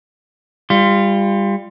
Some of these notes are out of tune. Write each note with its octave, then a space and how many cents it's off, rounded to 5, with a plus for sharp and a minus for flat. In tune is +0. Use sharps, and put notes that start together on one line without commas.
G3 +25 F4 -10